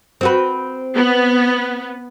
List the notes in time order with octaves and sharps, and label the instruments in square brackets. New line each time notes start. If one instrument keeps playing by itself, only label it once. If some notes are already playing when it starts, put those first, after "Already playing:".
[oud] C4 F#4 B4
[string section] B3